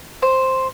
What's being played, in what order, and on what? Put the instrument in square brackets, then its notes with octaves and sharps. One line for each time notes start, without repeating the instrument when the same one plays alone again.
[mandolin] C5